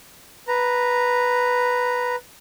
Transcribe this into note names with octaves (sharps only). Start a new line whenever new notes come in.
B4 A#5